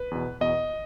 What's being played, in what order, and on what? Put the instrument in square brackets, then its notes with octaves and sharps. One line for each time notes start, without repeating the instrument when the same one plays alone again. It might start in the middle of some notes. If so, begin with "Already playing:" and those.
Already playing: [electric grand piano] B4
E2 B2
E2 B2 D#5